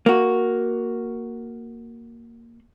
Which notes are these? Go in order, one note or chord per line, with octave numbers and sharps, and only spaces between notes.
A#3 F#4